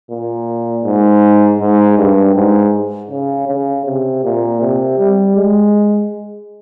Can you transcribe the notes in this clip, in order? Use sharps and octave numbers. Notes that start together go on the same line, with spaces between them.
A#2
G#2
G#2
G2
G#2
C#3
C#3
C3
A#2
C3
G3
G#3